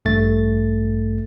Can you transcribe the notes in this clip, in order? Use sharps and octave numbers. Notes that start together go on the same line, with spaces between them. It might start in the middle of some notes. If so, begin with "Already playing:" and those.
A1 G2 A3 A6